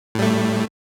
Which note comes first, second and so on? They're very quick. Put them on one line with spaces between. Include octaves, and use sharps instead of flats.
A2 G3 A3